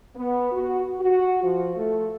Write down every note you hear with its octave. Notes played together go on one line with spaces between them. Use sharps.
B3
F#4
F#4
F3
A3